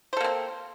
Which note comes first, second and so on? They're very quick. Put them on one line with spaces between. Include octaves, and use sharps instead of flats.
C5 A4 A#3 C4